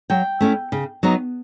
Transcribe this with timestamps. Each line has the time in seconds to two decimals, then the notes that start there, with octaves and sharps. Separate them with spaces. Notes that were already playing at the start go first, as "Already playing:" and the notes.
0.10 F#3 G5
0.41 A3 C#4 E4
0.72 C#3
1.03 F#3 B3 D#4